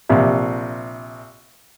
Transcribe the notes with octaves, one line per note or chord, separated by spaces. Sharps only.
A#1 C3